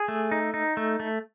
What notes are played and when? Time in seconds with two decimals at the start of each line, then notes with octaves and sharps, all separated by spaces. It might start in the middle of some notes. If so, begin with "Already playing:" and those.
Already playing: G#4
0.08 A3
0.32 D#4
0.54 D#4
0.77 A3
1.00 A3